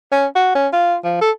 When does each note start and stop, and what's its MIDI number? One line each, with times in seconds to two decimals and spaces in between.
0.12 0.26 61
0.35 0.54 66
0.55 0.68 61
0.73 0.96 65
1.04 1.21 53
1.21 1.30 69